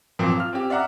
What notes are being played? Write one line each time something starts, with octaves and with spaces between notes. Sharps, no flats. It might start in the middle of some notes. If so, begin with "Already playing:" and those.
A#2 F3 F#3 C4
F4 F6
C4 C#4 G4
D5 E5 F#5 A#5